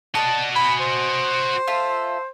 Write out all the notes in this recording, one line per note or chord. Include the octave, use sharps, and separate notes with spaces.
F#4 D5 D#5 A5
G#5 B5
C5
F4 A4 E5